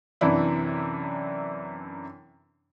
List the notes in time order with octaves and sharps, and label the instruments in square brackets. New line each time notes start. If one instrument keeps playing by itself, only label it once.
[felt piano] F#2 C3 E3 D4 E4